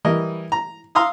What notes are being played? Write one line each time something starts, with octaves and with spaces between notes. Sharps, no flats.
E3 G3 A#4 D#5
A#5
F5 A#5 C6 D#6 E6